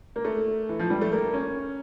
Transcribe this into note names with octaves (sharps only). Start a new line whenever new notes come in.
A#3
A3
E3
F3
G3
A3
A#3
C#4